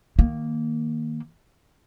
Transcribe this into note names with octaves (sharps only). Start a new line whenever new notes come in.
D#3 A#3